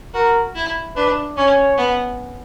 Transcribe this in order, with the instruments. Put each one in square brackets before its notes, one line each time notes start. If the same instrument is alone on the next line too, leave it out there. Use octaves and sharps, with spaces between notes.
[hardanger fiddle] F#4 [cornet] A#4
[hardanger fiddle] E4
[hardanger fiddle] D4 [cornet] B4
[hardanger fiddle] C#4 [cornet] C#5
[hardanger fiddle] B3